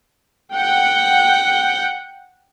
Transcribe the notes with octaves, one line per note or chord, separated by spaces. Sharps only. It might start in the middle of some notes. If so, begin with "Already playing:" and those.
F#5 G5